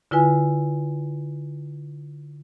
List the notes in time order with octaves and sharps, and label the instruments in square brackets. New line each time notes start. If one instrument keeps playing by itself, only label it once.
[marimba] D3 E4 F4 B4 G#5